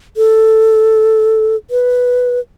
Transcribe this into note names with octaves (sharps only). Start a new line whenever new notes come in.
A4
B4